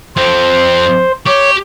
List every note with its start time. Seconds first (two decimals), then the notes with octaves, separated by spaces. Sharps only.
0.17 F2 C4 C5
1.26 G4 C#5